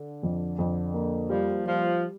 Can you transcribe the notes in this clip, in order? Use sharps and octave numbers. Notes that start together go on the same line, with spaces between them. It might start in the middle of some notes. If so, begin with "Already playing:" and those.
Already playing: D3
F2
F2
A#3
F3 G3
F3 G3